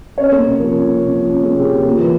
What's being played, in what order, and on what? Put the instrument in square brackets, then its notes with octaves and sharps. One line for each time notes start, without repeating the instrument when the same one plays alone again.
[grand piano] C#4 C#5
A#3
C3
F3 A#4
C#4
A#3
C3
F3
C#4
A#3 G#4
C3 G4
F3 G4
A#3 F4
E3